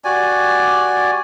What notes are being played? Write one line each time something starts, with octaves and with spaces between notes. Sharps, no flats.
F#4 G4 D5 G#5